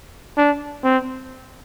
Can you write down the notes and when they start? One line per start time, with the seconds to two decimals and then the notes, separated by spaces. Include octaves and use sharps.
0.37 D4
0.84 C4